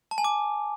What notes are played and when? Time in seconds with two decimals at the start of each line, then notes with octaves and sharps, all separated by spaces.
0.11 A5
0.18 G#5
0.24 D6